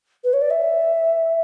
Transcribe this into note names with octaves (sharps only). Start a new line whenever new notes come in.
B4
C#5
D5
E5